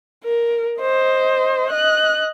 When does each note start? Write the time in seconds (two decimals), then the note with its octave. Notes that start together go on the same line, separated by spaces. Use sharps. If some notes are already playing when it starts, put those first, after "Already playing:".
0.24 A#4
0.81 C5 D#5
1.71 D#5 F#6